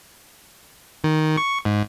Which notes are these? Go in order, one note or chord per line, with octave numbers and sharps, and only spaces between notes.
D#3
C#6
G#2